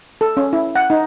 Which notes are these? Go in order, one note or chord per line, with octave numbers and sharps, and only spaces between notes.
A4
C#4
E4
F#5
D#4